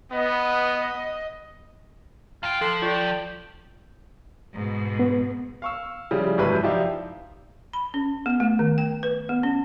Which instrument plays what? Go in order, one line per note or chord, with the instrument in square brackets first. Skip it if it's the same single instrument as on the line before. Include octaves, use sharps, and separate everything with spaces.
[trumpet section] B3 [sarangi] D#5
[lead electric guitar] E2 G5 [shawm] F4 [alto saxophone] F5
[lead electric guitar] F3 [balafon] A4 [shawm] C6
[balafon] F4 A4 [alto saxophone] D5 [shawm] G5
[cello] G#2 B2
[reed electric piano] B3
[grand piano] F5 C#6 E6
C#3 F3 G3 E4
G#1 F#2 C3 E4 B4 F#6
F3 D#4 G4 D5 E5 F5
[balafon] B5
C#4
B3
A3
D#3
G5
B4
B3
C#4